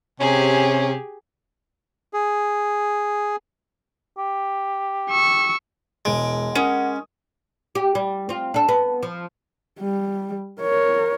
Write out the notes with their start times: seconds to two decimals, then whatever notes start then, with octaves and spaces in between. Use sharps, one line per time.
0.20 C3 C#4 G4 G#4
2.13 G#4
4.18 G4
5.11 C#6 E6
6.05 E1 G#3 D7
6.55 C#4 A#4 F#5 D#6
7.75 G4
7.95 G3
8.29 C4 F4
8.54 D4 A4
8.68 B3
9.03 F3
9.80 G3
10.60 A#4 C#5